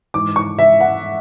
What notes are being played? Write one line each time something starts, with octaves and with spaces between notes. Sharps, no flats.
G#2 E3 D6
C#6
E5
F#5